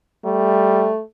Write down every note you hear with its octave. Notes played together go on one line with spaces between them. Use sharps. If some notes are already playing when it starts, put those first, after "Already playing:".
G3 A3